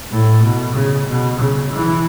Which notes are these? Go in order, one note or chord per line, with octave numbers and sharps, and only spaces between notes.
A2
B2
C#3
B2
C#3
E3